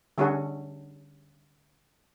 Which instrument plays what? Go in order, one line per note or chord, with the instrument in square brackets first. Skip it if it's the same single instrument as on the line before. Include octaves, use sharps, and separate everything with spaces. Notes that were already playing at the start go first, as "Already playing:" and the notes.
[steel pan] D3 G3 C#4 F#4 G#4 A4